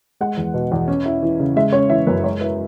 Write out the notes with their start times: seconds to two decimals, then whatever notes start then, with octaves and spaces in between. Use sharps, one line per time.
0.21 G#3 F#5
0.37 E2
0.54 B2
0.72 E2
0.88 C#4
1.06 E4
1.23 E3
1.40 C#3
1.56 G#3 E5
1.73 C#4 C#5
1.90 E3 E5
2.07 F#2 B4
2.24 G#3 C#5
2.41 E4 B4